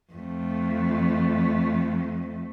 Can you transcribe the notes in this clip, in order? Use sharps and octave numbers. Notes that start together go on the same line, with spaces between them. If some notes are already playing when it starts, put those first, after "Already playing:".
F2 A3